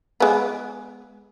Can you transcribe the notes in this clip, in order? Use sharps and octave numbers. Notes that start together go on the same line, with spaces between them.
G#3 B3